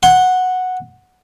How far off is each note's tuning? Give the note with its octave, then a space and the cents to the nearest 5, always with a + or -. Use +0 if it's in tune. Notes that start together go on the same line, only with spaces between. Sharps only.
F#5 -5 C6 +10